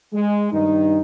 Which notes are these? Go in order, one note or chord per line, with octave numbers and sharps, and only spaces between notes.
G#3
G2 D#3 D#4